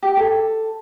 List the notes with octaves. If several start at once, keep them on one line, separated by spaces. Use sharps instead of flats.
G4
A4